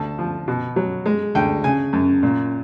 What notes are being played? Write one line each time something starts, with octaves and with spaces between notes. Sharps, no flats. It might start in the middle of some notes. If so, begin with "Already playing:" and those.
Already playing: D2 A5
F3
B2
F#3
G#3
D2 G5
C#3 G#5
F#2
A#2